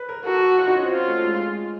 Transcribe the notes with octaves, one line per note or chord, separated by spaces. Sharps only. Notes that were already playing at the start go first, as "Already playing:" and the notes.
Already playing: B4
A#4
F#4 A4
F4
D#4
C#4
C4
F4
A3
G#3